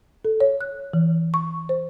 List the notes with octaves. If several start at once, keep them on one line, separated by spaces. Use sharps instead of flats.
A4
C#5
F#6
E3
C#6
C5